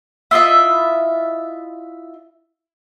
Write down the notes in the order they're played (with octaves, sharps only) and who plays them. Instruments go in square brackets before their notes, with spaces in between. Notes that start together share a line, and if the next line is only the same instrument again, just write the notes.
[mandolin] E4 F4 D#5 E5